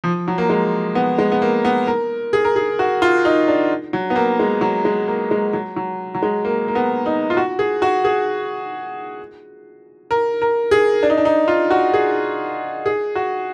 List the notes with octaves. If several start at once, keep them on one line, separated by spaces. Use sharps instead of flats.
F3
F#3
A#3
G#3
B3
G#3
B3
A#3
B3
A#4
G#4
A#4
G#4
F#4
F4
D#4
D4
F#3
B3
A#3
G#3
F#3
G#3
A#3
G#3
F#3
F#3
F#3
G#3
A#3
A#3
B3
D#4
F4
F#4
G#4
F#4
G#4
A#4
A#4
G#4
D4
D#4
D4
D#4
F4
F#4
G#4
G#4
F#4